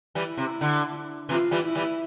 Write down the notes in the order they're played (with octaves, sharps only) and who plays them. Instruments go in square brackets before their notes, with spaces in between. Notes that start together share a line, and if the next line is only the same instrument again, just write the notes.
[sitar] E3 G3
[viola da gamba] E4
[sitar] C3
D3
[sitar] C3 E3 [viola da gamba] F4
[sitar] E3 G3
[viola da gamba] E4
[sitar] E3 G3